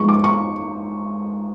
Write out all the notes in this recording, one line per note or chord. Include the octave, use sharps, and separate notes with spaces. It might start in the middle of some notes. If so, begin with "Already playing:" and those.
Already playing: G#2 F3 G#3 C#6
D6
C#6